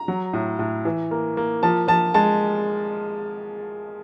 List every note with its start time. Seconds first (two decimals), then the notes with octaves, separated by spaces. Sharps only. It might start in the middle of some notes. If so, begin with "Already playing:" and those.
Already playing: A#5
0.08 F#3
0.33 A2
0.59 A2
0.85 E3
1.11 A#3
1.37 A#3
1.63 F3 A5
1.88 F3 A5
2.14 G#3 A5